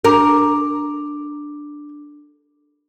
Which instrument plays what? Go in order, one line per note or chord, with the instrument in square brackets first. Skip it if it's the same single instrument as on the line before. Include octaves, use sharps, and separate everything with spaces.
[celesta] D4 D6 [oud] A#4